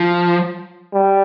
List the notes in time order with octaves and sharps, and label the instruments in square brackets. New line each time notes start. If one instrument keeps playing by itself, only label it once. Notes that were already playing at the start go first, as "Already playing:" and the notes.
Already playing: [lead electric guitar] F3
[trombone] G3